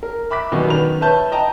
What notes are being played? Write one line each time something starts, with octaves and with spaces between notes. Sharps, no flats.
A#4
E5 B5 D6 F#6 B6
F#2 B2 D#3 F#3 G3 B3
D#3 B4 F7
B4 C#5 E5 A5 G6
D#5 G5 A5 A#5